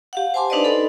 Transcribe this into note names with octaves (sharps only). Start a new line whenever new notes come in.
G4 F5 F#5
C5 G#5 A5 C6 D6
D4 D#4 B4 C5 D5 D#5
A4 B5